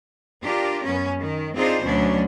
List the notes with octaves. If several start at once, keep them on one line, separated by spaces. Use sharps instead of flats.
D4 F4 G4 A#4
F#2 B3 C#4
D#3
C4 D4 D#4 F4 G#4 C5
D2 B2 F#3 C#4 D4